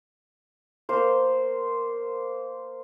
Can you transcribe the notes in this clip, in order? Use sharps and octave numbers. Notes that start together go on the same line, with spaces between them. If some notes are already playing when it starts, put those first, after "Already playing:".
A#3 C5